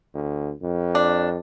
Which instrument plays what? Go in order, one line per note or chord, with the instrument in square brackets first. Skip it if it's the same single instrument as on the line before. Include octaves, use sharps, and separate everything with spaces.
[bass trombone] D2
F2
[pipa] D4